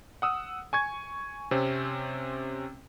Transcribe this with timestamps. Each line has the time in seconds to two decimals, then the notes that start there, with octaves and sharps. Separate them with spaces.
0.22 F#5 D#6 E6
0.73 G#5 C#6 G#6
1.51 C3 C4 C#4